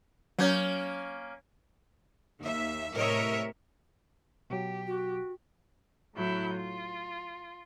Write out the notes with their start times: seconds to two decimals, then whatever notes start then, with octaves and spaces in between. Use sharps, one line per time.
0.39 F#3 A#3 C#4 G6
2.39 D#2 A#3 E5
2.93 A2 C3 A#4 C#5 D#5 E5
4.50 B2 F#3 G4
4.87 F#4
6.15 A2 F#3 E4 G6
6.55 F4